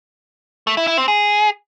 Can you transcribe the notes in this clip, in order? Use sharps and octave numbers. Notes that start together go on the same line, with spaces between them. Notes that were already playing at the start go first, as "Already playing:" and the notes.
A3
E4
E4
C4
G#4